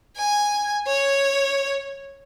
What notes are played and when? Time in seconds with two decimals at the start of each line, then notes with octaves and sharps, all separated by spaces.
0.17 G#5
0.87 C#5